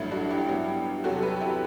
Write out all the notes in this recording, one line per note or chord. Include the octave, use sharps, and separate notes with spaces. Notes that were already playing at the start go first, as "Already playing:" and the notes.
Already playing: A1 G2 F#3 A3 E4
D4 F#4
E4 G4
G2 F#3 B3
E2 C3 F#3 F#4 A4
G4 B4
E4 G4